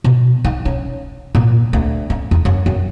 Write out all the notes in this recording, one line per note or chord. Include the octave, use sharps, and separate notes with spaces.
B2
D#4
C#4
A#2
D2
C#4
E2
F#2
F#2